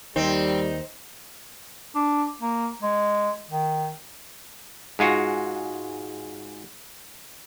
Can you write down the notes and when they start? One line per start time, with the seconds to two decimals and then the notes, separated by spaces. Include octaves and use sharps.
0.16 D#2 D#3 G3 C4 D#4
1.95 D4
2.41 A#3
2.82 G#3
3.49 D#3
4.99 G#2 G#3 F4 F#4